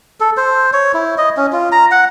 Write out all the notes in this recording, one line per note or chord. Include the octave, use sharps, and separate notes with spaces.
A4
C5
C#5
E4
D#5
C#4
F4
A#5
F#5